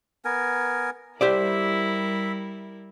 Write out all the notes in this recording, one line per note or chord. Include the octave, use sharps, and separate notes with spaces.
B3 A#4 G#5
G3 E4 G4 A#4 C5 D5 E5